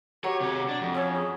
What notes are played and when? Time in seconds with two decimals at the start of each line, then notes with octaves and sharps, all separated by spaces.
0.24 F#3 G4 C#5
0.40 C3 G#4
0.69 D4
0.81 F2
0.95 C#4 C#5 E5
1.14 G#4